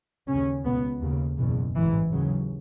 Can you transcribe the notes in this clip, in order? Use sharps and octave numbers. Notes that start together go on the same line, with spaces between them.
D#2 C#3 C#4
C#2 B2 B3
D#2 C#3
F#1 E2 B2
A1 G#2 E3
D#2 C#3 F#3